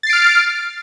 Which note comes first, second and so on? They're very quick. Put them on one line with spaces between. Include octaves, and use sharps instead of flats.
A6 C7 D7 F6